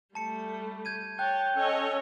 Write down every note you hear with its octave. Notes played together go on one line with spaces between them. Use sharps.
G3 A3 A5 C#7
G6 G#6 D#7
C#5 G5 A5 F#6
C#4 A4 C#5 D#5